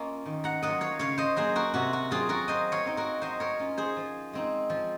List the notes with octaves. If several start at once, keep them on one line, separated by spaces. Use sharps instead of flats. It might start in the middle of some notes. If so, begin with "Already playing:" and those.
Already playing: A#3 C#4 F4 D#5
D#3
F#5 A#5
F#3 A#3 F4 D#5 F#5
C#5 F5
C#3 C#5 F5
C5 D#5
F#3 A#3 G#4 C5
F#4 A#4
C3 F#4
F#4
F#3 C4 F4 G#4
F#4 A#4
F#3 C5 D#5
C#5 F5
C4 D#4
F#4 A#4
F#3 C5 D#5
A#4 C#5
C#4 F4
G#4 C5
F3
G#3 C4 D#4
F3